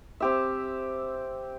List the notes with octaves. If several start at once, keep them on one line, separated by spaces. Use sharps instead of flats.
C4 G4 E5